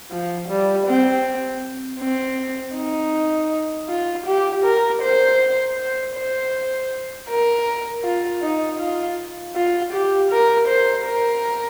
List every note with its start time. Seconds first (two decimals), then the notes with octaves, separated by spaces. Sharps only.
0.11 F3
0.49 G3
0.87 C4
2.00 C4
2.76 D#4
3.89 F4
4.27 G4
4.65 A#4
5.02 C5
5.77 C5
6.15 C5
7.29 A#4
8.04 F4
8.42 D#4
8.80 F4
9.56 F4
9.93 G4
10.31 A#4
10.68 C5
11.06 A#4